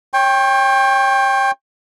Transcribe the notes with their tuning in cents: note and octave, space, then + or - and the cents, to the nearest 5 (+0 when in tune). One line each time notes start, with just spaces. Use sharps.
C#5 +0 G5 +15 C#6 -45